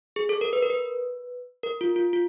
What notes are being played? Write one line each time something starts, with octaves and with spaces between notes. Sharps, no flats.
G#4
A4
A#4
B4
A#4
B4
A#4
F4
F4
F4